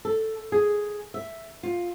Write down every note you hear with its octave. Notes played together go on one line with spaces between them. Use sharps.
A4
G#4
E5
F4